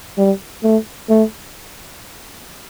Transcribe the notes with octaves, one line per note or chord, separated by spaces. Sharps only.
G3
A3
A3